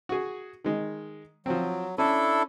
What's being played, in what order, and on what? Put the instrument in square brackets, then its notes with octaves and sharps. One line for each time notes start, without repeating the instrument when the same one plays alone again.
[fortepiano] F#4 G#4
D#3 G#3
[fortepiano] F3 C4 [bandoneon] F#3
[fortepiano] C#4 [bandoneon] D4 E4 A4